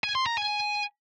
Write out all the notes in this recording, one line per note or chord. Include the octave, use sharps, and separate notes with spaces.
G#5
C6
A#5
G#5